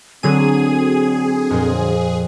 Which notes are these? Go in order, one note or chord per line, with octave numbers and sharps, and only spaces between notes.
D3 F#3 C4 G#4 D#7
F2 A#2 C5